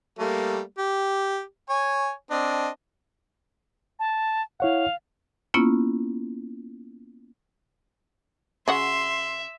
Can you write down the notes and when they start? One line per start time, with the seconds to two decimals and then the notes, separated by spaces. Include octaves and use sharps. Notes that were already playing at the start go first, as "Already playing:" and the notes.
0.19 G3 A3 A#3
0.78 G4
1.69 C#5 G#5
2.31 C4 D4 D#5
3.99 A5
4.60 E4 C#5 F5 F#5
5.54 A#3 B3 C#4 E4 F4
8.68 C#3 F#4 E5 F#5 C6